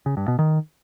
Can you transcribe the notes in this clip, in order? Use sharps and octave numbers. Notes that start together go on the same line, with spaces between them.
C#3
G2
B2
D#3